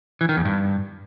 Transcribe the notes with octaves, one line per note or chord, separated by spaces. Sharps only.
E3
D#3
E2
G2